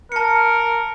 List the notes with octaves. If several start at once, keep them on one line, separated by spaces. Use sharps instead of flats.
A#4 A5 C#7